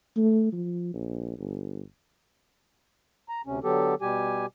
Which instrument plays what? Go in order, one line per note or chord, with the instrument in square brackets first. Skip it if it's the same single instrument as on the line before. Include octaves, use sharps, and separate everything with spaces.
[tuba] A3
F3
A#1
G1
[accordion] A#5
D2 C3 C#4
D3 F#3 B3 G4 A4
B2 G3 G4 G#5